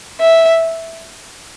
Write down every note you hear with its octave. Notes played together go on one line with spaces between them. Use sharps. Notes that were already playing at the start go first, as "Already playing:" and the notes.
E5